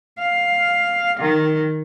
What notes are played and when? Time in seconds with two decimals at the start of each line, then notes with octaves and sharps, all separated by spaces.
0.18 F5
1.20 D#3